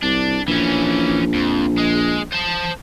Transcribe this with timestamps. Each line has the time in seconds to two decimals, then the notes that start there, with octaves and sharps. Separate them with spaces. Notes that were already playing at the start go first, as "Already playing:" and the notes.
0.03 C2 D4
0.48 A#1 E3 C#4
1.34 F2
1.78 G#3
2.33 C5 A5